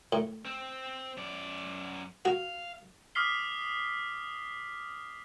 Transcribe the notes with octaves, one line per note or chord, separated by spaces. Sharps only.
A2
C4
F#2 D5
F#4 F5
D6 D#6 F6 B6 C7 G7